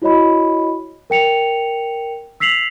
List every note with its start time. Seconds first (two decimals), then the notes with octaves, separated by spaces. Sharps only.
0.02 E4 F#4 C#5 D#5 B5
1.10 A#4 G5 C#7 F7
2.40 E6 B6 C7 F7 F#7